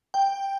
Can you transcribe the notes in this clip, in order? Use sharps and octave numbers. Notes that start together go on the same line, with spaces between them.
G5